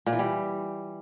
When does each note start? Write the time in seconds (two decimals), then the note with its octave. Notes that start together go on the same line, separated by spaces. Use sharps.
0.06 A#2
0.13 E3
0.19 G3